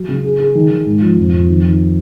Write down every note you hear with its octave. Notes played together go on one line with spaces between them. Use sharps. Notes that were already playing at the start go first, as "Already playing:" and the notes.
Already playing: F#3
C#3
G#4
G#4
D#3
D#3
G#2
F3
F2
F2
D#3
D#3